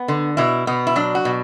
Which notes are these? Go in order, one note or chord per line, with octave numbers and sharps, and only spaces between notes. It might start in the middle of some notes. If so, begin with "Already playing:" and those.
Already playing: B3
D3
B2 E4
B2 B3
E4
F#3 D4
F#4
B2